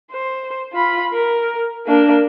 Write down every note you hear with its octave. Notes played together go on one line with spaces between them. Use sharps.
C5
F4 B5
A#4
A#3 D4